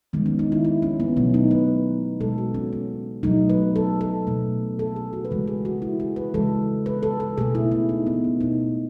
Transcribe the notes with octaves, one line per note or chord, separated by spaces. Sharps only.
D#3 G#3 B3
C#4
D#4
E4
E4
C#4
B3
B2 F#3 A3 C#4
D#4
B4
B2 G#3 A4
F#4
C#4
C#4
B2 F#3 A3 D#4
B4
A4
A4
B2 A3
A4
G#4
F#4
B4
C#3 E3 G#3 A4
G#4
F#4
E4
G#4
B4
C#3 E3 G#3 A4
B4
A4
A4
B2 A3 G#4
E4
E4
D#4
B3
C#4
B2 A3 D#4